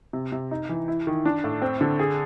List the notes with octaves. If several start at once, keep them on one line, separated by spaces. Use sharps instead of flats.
C3
C3
D#4
E3
E4
D#3
D4
A2
C4
D3
G#4